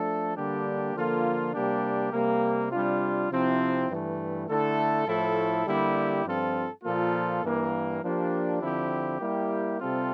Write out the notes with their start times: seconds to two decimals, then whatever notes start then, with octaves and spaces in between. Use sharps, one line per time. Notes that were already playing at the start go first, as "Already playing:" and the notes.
Already playing: F3 A3 D4 A4
0.35 D3 G3 A#3 D4 G4
0.94 D3 F3 A#3 F4 A4
1.53 C3 G3 A#3 D4 G4
2.12 C3 G3 A#3
2.71 C3 G3 D4 F4
3.30 C3 F3 C4 E4
3.89 G2 E3 A3
4.48 D3 A3 E4 A4
5.07 A2 F3 A3 E4 A4
5.66 D3 G3 A#3 E4 G4
6.25 G2 F3 C4 F4 A4
6.84 A#2 F3 A#3 F4 A4
7.43 G2 E3 A#3
8.02 F3 A#3 D4 G4
8.61 D3 F3 C4 E4 G4
9.20 G3 A#3 E4 G4
9.79 C3 G3 C4 F4 A4